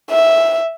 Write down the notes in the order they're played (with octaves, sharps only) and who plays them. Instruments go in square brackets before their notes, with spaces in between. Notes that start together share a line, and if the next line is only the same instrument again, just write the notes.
[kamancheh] E5